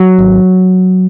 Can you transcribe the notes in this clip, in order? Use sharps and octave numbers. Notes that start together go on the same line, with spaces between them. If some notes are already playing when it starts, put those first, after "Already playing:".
Already playing: F#3
G#1